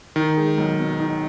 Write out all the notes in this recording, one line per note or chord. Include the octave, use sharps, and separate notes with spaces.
D#3 D#4
G#3
B1
B2
D#4